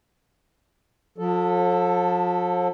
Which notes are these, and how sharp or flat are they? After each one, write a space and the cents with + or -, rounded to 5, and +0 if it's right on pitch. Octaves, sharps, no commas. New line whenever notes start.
F3 +40 A4 +0